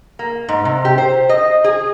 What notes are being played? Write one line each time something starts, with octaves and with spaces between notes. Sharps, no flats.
A#3
G#2
C3
G4
C5
D#5
G#4